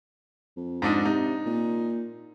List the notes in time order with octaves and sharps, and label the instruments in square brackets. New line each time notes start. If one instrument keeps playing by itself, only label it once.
[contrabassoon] F2
[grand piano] G#2 D4 D#4
[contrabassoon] C3 [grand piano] D#4
[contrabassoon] A#2